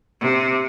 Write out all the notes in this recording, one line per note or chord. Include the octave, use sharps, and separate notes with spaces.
C3